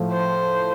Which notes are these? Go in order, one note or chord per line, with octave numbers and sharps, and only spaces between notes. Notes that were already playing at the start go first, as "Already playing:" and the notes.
Already playing: A2 F3 A3
C5